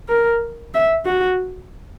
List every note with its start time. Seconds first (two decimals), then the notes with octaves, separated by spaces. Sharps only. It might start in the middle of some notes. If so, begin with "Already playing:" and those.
0.09 A#4
0.74 E5
1.05 F#4